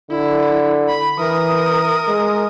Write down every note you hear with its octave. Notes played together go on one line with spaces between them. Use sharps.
D3 E4
B5
E3 A#4 D#6
G#3